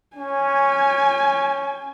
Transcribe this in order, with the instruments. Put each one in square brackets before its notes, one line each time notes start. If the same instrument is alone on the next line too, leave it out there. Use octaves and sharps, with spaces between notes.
[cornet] C#4 [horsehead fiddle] G#5